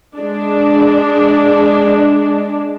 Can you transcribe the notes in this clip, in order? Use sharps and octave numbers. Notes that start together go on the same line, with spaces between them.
G#3 D4